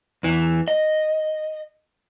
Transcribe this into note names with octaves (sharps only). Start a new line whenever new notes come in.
E2 E3
D#5